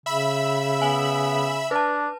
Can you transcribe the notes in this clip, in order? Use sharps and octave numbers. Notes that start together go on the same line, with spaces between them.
C#3 E5 B5 E6
B3 G#5 F#7
D4 B4 A5